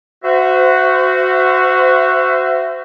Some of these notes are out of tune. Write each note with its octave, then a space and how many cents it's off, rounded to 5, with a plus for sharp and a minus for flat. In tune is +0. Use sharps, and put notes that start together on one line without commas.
F#4 +0 C5 -25 E5 +25